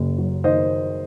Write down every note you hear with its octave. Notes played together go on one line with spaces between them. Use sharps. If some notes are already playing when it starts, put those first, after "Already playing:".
Already playing: F#1 F#2
F#3
D#3 C5 D#5